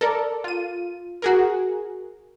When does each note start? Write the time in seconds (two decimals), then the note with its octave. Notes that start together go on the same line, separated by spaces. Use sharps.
0.01 A4 A#4 D5
0.44 F4 D#7
1.22 F#4 G#4 A#4